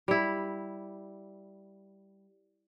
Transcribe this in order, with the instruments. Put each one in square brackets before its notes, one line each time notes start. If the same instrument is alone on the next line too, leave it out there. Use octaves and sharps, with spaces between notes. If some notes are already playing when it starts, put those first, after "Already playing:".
[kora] G3 E4